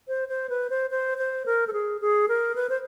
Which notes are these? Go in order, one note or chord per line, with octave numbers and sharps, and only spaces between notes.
C5
C5
B4
C5
C5
C5
A#4
A4
G#4
G#4
A#4
B4
C5